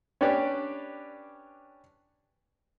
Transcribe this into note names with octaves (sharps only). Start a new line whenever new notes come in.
C#4 D4 G4 B4 D5